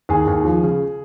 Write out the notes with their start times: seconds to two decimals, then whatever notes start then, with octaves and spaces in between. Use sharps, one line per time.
0.09 D#2 G#4
0.27 D#2
0.45 F3
0.63 C#3